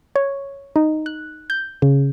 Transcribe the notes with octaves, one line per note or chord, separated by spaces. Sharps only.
C#5
D#4
F#6
G6
C#3